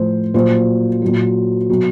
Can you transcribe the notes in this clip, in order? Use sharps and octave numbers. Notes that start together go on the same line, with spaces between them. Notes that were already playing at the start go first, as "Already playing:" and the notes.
Already playing: A2 F3 C5
A#2 F#3 C5
A#2 F#3
B2 F#3